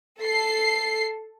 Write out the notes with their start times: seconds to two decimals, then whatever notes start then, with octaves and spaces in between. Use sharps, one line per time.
0.21 A4 C7